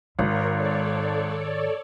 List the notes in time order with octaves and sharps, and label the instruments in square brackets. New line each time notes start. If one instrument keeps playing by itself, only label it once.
[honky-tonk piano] G#1 [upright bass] G#2 D#3 [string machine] A#4 C#5
[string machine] A4 C#5 D5